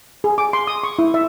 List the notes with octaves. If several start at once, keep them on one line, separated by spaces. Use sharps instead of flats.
G#4
D6
C6
D#6
C#6
E4
E5